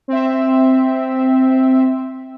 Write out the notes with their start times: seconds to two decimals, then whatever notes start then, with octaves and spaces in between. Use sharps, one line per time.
0.08 C4 E5